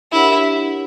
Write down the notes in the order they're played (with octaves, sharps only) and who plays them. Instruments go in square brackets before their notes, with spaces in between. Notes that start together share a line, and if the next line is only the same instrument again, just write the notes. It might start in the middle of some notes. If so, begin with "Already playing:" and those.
[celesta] D4 G4 A#4 C#5 F#5 [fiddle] E4